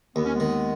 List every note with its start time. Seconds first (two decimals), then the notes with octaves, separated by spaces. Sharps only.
0.16 D#2 B3
0.25 C#4
0.35 D#3 G#3 B3